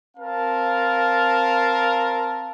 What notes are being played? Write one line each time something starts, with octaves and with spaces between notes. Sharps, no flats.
C4 A#4 F5 A5